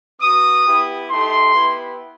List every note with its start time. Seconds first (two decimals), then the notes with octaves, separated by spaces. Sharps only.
0.21 B3 F#4 D#6
0.66 B3 E4 G4
1.10 A3 D#4 G4 C6
1.54 B3 E4 G4